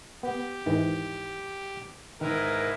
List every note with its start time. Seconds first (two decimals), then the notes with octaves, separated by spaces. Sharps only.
0.23 B3 G4
0.66 G#2 D#3 E3
2.21 G#2 D#3 E4 A#4 B4